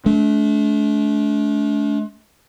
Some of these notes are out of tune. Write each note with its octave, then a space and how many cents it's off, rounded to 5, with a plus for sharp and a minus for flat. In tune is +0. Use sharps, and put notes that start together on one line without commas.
A3 -40 D4 -40